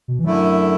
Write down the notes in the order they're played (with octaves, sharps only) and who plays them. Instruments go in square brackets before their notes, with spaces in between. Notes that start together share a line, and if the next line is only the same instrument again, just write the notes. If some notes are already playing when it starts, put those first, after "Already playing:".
[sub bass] B2
E3
[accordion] F#2 D3 A3 E4 [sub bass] F#3